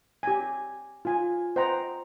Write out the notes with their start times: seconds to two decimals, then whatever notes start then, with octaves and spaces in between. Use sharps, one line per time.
0.23 G4 G#5
1.05 F4 G#5
1.56 C5 D#5 F#5 G5 A#5